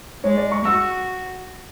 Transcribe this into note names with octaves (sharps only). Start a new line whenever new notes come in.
G#3 C#5
D5
C#6
F#4 E6